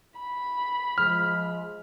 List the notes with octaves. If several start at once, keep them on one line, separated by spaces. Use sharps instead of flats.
B5
F3 G#3 F6